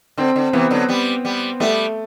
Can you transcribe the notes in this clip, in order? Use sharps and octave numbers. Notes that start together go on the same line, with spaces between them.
D3 C4
D3
C3 E3 B3
D3 F#3
G3 B3
G3 B3
G3 A3 B3